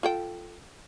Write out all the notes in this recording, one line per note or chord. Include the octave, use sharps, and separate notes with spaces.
F4 A4 G5